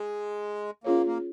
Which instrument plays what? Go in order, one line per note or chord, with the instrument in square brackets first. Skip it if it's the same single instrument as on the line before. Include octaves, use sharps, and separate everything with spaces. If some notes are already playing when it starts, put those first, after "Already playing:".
Already playing: [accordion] G#3
[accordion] A#3 [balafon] C#4 F4 G#4 C#5
[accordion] A#3